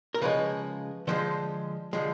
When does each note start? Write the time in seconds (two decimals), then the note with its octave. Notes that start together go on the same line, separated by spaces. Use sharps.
0.14 A#4
0.22 C#3 F3 G#3 B4
1.07 D3 F3 G#3 C5
1.93 D3 F3 G#3